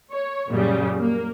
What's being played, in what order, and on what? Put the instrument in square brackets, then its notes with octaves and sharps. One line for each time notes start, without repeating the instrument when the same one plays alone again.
[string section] C#5
F#2 A#2 C#3 G3
A#3